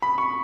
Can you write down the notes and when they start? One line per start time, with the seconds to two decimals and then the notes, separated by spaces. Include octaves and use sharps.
0.02 B5
0.18 C#6